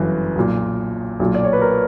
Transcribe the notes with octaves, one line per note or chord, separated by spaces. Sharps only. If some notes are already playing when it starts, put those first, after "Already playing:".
Already playing: G1 F#2 E3
B1 A#2
B1 A#2
D5
C#5
B4
A#4